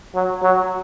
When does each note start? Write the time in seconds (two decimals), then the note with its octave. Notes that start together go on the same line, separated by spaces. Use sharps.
0.15 F#3
0.43 F#3